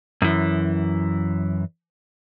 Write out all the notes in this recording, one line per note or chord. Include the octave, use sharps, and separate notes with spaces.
F#2 E3